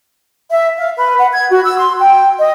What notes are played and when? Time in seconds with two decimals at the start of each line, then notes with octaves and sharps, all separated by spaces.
0.50 E5
0.78 F5
0.97 B4
1.18 F#5
1.33 G#6
1.50 F#4
1.65 E6
1.79 C6
1.99 G5
2.39 D#5